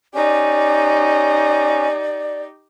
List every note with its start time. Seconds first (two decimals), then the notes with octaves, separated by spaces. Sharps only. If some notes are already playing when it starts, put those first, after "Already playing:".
0.14 C#4 D#4 G4 D5